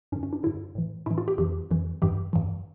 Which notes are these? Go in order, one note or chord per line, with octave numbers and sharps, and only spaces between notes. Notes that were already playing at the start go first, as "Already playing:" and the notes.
G2 D3 C#4
C#4
D4
G2 D3 E4
A2 E3
A2 E3 E4
F4
G4
F2 E3 G4
F2 E3
G2 E3 G4
G2 E3